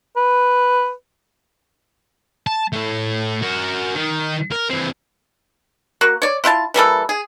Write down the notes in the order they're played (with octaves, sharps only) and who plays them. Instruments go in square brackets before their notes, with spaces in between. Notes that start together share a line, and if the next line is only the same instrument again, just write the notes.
[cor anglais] B4
[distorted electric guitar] A5
A2 A3
F#4 A#4
D#3
A#4
E3 C4
[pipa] A#3 F#4
C#5 D5
E4 F4 G5 A5
E3 G3 A#3 A4
G#4